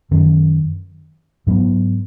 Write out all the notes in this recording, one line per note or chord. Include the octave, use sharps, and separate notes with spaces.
F#2 D#3 F#3 C#4
G#2 F#3 B3